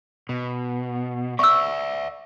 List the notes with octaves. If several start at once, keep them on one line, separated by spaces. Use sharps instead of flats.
B2
D5 E5 C#6 E6